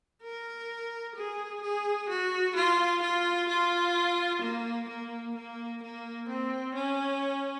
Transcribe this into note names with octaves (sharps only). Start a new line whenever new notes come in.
A#4
G#4
G#4
F#4
F4
F4
F4
A#3
A#3
A#3
A#3
C4
C#4